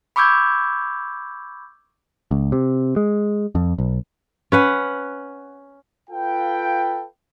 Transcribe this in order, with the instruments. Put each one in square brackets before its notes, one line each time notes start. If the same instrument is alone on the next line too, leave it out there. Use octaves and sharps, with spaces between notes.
[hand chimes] B5 C#6 D6 E6 G6 G#6
[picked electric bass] C#2
C3
G#3
F2
B1
[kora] C#4 B4 F#5
[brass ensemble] F4 A4 B4 F5 G5